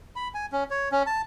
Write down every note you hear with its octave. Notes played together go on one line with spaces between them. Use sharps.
B5
G#5
C#4
C#5
C#4
A5